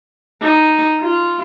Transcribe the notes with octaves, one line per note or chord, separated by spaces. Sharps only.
D#4
F4